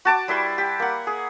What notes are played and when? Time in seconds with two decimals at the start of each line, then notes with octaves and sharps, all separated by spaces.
0.05 F#4 A5 D6
0.28 G3 E4 B4 C6
0.58 G4
0.80 A#3 F#5
1.07 G#4